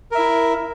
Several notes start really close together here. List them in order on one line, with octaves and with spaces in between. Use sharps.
A#4 E5 E4